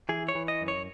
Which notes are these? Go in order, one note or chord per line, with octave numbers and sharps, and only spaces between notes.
E3 G#4
C#5
E3
D#5
F#2
C#5